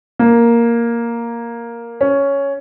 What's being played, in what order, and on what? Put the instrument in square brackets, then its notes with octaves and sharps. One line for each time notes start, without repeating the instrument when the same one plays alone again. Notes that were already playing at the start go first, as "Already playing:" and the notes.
[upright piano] A#3
C#4